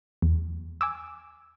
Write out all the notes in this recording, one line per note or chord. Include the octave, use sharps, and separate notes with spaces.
E2
G#5 D6 E6